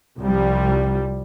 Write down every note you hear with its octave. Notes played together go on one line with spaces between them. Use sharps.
C2 F3 G3